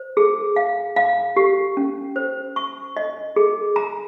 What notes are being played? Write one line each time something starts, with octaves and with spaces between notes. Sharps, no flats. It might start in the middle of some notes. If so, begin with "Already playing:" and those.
Already playing: C5
G#4
F5
F5
G4
C#4
C5
C#6
D#5
G#4
A#5